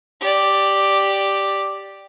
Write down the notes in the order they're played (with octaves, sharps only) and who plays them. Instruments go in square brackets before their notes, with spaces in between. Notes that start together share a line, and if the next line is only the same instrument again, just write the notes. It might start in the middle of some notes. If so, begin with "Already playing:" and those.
[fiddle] G4 D5